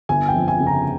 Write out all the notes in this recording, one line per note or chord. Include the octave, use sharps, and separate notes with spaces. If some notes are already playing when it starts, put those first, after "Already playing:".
G1 G#5
G5
F2
G#5
C#3
A#5